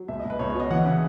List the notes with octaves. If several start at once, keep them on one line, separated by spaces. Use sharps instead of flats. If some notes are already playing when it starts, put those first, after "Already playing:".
Already playing: F#3
C#2 E5
D#5
C#2
B4
C#2 C#5
C#5
B2 D#5
E3 F#5
C#3